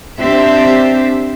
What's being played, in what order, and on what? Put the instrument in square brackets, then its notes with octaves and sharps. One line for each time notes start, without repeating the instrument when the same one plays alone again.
[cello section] C4 D4 G4 C5 E5